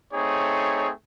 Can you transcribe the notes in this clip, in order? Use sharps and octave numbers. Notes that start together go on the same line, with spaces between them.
A3 C4 D#4 G#4 C#5